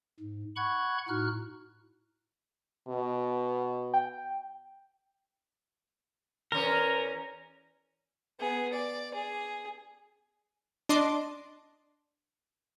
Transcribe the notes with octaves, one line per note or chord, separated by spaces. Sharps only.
G#2
F#5 B5 C#6 F#6 G#6
A2 D#4 F#4 F6 F#6
B2
G5
E2 C#4 A#4
B3 G#4
D5
G#4
D4 D#5 C6 D6